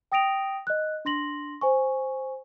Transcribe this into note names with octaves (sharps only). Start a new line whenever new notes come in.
G5 D#6 A#6 D7 F7
D#5 F#6
D4 C6 A#6 F#7
C5 G#5 C#6